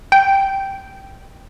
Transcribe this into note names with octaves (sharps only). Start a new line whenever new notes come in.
G5